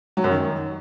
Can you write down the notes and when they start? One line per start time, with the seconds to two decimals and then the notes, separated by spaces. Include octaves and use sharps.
0.17 F#3
0.24 F#2
0.31 D#3